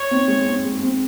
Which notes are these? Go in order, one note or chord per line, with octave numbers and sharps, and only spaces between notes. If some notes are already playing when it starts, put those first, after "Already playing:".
Already playing: C#5
C4
G#3
C4
G#3
C4